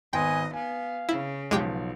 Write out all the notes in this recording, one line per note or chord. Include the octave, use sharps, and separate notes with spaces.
G#1 B3 D#5 G5 G#5 C6
B3 F5 G#5
C#3 E4
B1 F3 G#3 B3 G4 G5